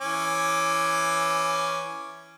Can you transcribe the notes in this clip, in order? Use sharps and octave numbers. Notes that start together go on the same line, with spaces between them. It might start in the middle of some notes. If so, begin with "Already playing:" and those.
E3 C#4 D6